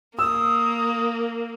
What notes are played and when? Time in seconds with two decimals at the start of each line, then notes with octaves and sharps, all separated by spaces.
0.19 A#3 D#6 E6